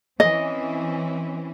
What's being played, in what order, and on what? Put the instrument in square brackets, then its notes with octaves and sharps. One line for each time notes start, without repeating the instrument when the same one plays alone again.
[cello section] E3 C4 C#4 [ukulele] D#5